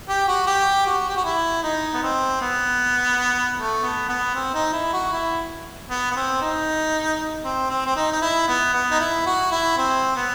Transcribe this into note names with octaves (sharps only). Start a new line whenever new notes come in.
G4
F#4
G4
F#4
G4
F#4
E4
D#4
B3
C4
B3
A3
B3
B3
C4
D#4
E4
F#4
E4
B3
B3
C4
D#4
C4
C4
C4
D#4
D#4
E4
B3
B3
D#4
E4
F#4
E4
C4
B3